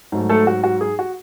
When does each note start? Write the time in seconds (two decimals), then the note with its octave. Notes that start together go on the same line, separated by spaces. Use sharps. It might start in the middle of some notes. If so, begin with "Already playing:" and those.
0.12 G#2 F#3 A3
0.29 A3 A4
0.47 F#4
0.64 F#4
0.81 G#4
0.99 F#4